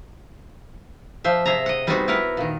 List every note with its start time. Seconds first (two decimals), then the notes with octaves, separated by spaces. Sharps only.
1.24 F3 C5 E5
1.46 C3 G#4 E5 A#5
1.66 D#5 F#5
1.87 G3 G#3 B3 C4 D#4 F#4
2.08 B3 E4 A#4 B4 F#5
2.37 A#2 D#3